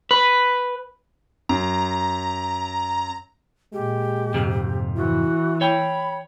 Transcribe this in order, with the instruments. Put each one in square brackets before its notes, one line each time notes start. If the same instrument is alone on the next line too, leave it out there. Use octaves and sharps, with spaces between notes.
[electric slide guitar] B4
[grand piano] F#2 [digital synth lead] A#5
[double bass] A#2 [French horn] G#3 [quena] G4
[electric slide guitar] F2 G#2 C3
[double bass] E3 [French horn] E4 [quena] F#4
[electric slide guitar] C#5 G5 [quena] B5